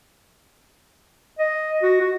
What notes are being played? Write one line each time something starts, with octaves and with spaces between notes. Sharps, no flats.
D#5
F#4
F#4